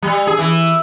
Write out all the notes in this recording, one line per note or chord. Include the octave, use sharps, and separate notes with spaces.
G3
G#4
E3